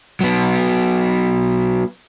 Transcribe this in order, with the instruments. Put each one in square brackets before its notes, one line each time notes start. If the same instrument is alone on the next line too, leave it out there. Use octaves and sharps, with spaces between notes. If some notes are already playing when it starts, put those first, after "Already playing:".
[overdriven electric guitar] F#3 B3